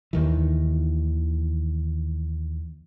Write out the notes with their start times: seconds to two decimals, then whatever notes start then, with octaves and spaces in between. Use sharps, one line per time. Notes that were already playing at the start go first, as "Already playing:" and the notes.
0.13 D#2 D#3 E3